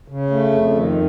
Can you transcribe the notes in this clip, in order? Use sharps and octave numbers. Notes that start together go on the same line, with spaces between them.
C#3
A3
F2
D#3